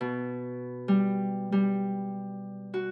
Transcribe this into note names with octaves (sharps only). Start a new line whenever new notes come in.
B2
G3
G3
F#4